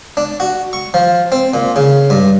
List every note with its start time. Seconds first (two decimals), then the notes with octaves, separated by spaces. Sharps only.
0.17 D4
0.40 F#4
0.73 C#6
0.94 F3
1.32 C4
1.54 A#2
1.76 C#3
2.10 G2